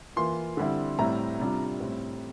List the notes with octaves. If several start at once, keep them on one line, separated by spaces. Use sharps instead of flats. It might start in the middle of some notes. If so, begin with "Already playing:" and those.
E3 A#3 F4 C6
D3 G3 C4 E4
A2 G3 C4 E4 A#5
C3 G3 D4 F4
A2 G3 C4